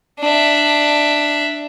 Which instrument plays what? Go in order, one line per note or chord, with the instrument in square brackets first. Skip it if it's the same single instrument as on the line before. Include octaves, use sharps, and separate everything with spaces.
[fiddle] D4 E5